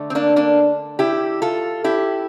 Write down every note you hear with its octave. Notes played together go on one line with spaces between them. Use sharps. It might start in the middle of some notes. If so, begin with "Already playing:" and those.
Already playing: D3 A3
C4
A#3 D4
A#3 D4
E4 G4
F4 A4
E4 G4